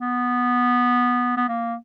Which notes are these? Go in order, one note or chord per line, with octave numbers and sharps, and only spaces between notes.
B3
B3
A#3